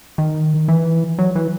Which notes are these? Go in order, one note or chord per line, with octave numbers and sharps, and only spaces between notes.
D#3
E3
F#3
E3